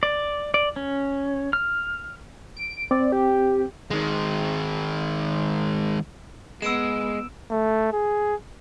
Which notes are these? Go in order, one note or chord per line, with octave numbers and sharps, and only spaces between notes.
D5
D5
C#4
F6
D7
C4 D5
G4
D#3 G#3
G#3 B3 E6 D7 E7
A3
G#4